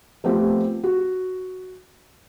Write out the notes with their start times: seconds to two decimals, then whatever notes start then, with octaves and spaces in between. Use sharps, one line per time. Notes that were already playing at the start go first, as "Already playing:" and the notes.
0.24 F3 A3 B3 C4 G4
0.84 F#4